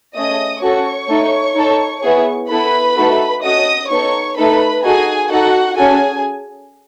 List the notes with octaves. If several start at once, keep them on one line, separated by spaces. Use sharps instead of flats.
A3 C#4 G#4 D#5 D#6
C#4 F#4 A4 C#5 C#6
A3 D#4 A4
D#4 A4
B3 E4 G#4
B3 E4 A4 B4 B5
A3 D#4 F#4 A4
C#4 F#4 A4 D#5 D#6
B3 D#4 A4 C#5 C#6
A3 D#4 A4 B4 B5
D#4 F#4 G#4 A4 G#5
D#4 F#4 A4 F#5
C#4 F#4 G#4 A4 G#5